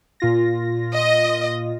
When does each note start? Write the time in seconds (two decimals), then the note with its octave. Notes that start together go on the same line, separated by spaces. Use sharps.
0.20 A#2 F4 A#6
0.94 D#5